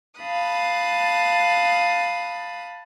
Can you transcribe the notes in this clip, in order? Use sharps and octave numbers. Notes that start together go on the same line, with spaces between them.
F5 A5 B5 D#6 F#6